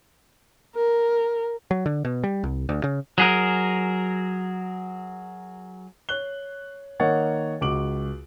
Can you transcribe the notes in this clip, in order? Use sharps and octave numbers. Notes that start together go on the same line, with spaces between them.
A#4
F#3
D3
B2
G3
C2
D2
C#3
F#3 G#4 A#4
C#5 F#6 G7
D#3 A#3 C#5 D#5 F#5 A6
C#2 F#4 D6 D7 F#7